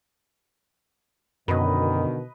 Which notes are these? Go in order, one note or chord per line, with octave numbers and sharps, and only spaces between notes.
F#2 B2 D3 D#3 B4 D#5